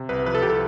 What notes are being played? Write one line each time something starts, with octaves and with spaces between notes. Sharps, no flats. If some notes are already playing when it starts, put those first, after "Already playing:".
Already playing: C3
C2 B4
F3 B4
A4
C2 G4
A4